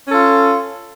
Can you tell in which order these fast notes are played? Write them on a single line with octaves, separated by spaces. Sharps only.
C#4 A4 F4